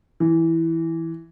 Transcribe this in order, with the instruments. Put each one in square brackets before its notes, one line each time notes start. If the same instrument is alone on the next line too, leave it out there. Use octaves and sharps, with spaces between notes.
[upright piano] E3